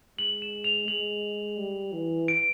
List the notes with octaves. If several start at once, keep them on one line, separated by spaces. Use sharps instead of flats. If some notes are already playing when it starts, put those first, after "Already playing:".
G#3 F#7
E7
F7
G#3 F#7
G3
E3
D7